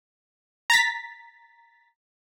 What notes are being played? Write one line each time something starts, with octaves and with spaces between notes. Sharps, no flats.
A#5 A6 B6